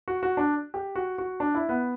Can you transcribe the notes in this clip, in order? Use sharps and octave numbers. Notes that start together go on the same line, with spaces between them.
F#4
F#4
D4
G4
F#4
F#4
D4
E4
B3